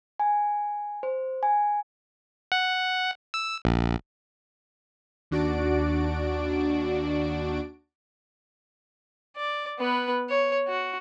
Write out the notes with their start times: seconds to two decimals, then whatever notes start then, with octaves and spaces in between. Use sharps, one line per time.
0.20 G#5
1.03 C5
1.43 G#5
2.52 F#5
3.34 E6
3.65 A#1
5.31 D#2 D4 F#4 D5 D7
9.37 D5
9.79 B3 B4
10.29 C#5
10.68 F#4